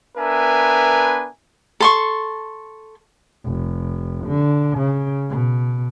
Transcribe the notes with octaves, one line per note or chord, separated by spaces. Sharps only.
B3 D4 A#4 B4 E5 G#5
A4 C6 C#6
F1
D3
C#3
B2